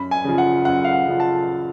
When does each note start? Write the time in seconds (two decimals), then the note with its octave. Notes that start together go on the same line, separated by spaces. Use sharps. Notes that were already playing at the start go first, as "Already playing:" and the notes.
Already playing: F#2 B5
0.11 G#5
0.24 C#3 F3
0.38 F#5
0.65 F#2 F#5
0.84 F5
0.93 F#5
1.07 C#3 F3
1.20 A5